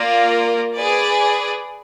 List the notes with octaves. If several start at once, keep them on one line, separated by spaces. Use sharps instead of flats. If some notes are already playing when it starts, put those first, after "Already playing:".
Already playing: A#3 F4 A#4 D5
G#4 B4 D5